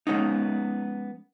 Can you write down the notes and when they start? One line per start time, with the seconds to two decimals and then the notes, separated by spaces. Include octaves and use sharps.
0.07 F3 G#3 B3 C#4 D#4